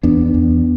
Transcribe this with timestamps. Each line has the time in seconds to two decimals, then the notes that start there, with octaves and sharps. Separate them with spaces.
0.03 E2 B3 D4
0.34 E2